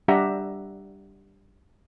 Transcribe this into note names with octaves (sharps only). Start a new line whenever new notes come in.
G3 D4 G4 E5 F#5 A#5